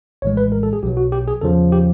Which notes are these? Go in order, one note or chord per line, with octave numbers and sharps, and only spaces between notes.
A#1 A2 E3 G#3 C#5
B4
A#4
A4
G#4
B1 B2 F#3 G4
F#4
G4
G#4
E2 C#3 F3 A4
G4